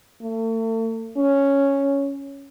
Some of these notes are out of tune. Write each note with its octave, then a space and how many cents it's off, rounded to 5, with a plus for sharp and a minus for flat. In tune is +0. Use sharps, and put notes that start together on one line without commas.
A3 +40
C#4 +0